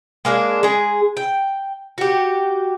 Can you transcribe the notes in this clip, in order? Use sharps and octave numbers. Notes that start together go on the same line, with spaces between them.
G#3 A#3 D4 G#4
G#3 G#4
G5
F#4 G4